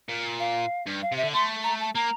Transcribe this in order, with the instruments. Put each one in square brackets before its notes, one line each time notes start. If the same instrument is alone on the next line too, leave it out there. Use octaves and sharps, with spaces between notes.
[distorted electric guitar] A#2
[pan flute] F5
[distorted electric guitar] G2
[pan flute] F5
[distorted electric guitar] C3
[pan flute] E5
[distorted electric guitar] D3
[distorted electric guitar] A3 [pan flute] C6
[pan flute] A#5
A5
[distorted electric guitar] A#3 [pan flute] A#5